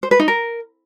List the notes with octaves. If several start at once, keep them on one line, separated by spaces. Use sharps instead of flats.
C5
B4
D#4
A#4